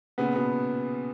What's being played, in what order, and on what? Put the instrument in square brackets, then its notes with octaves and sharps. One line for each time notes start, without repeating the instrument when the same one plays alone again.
[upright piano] A#2 C#3 [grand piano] B3
[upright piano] B2 [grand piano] B3